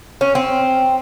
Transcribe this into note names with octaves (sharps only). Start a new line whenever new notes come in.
C#4
C4